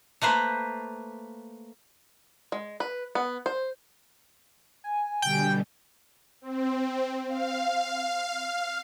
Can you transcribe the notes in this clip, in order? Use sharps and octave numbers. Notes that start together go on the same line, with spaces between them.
A3 A#3 B4 C5
G#3
B4
B3
C5
G#5
B2 D3 G3 G5
C4
F5